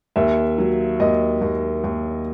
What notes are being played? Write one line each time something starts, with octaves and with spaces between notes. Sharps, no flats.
D#2 E5
F#3
D#2 D#5
D#2
D#2